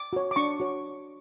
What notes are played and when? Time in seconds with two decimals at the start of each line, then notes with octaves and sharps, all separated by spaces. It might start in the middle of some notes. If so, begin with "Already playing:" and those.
Already playing: D6
0.13 F#4 C#5
0.31 D6
0.36 D4 C#6
0.60 F#4 C#5